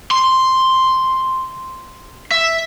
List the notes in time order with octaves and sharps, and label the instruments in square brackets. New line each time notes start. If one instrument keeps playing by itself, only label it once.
[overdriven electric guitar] C6
E5